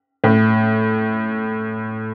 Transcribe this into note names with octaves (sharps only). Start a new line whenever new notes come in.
A2